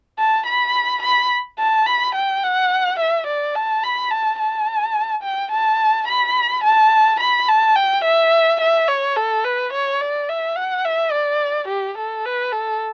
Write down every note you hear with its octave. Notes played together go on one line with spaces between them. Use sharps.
A5
B5
B5
A5
B5
G5
F#5
E5
D5
A5
B5
A5
A5
G5
A5
B5
A5
B5
A5
G5
E5
E5
C#5
A4
B4
C#5
D5
E5
F#5
E5
D5
G4
A4
B4
A4